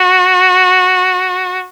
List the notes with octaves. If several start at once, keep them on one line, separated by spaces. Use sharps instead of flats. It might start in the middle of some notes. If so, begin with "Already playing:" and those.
Already playing: F#4